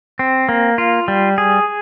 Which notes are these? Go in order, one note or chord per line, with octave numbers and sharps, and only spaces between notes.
C4
A#3
F4
G3
G#4